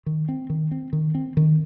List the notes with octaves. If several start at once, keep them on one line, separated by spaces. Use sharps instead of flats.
D#3
C4
D#3
C4
D#3
C4
D#3